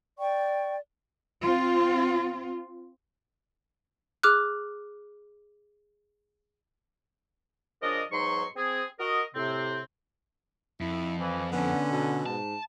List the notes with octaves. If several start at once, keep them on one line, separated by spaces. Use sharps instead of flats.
D5 G5 C#6
C4 F4
G#4 D6 F6 F#6
C#3 F3 D4 A#4 D5 D#5
G#2 B2 F#3 D#4 C6 C#6
C4 G#4
F#4 A#4 D#5
A2 C3 C4
F2 E4
E3 F3
D3 B3 C#4
B2
G#2 A5